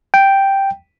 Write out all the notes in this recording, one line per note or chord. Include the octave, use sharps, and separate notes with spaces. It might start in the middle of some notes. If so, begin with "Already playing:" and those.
G5